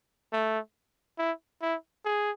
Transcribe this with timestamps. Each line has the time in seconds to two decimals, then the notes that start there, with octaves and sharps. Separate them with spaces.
0.33 A3
1.18 E4
1.62 E4
2.05 G#4